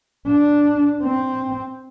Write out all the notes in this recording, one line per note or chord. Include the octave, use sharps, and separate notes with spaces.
D4
C4